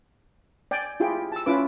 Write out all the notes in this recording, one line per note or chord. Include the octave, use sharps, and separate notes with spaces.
D5 G5 G#5
E4 F4 G4 G#4 G5
A5 E6
C#4 E4 F4 B4 D6